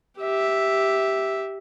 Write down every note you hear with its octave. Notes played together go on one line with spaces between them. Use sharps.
G4 E5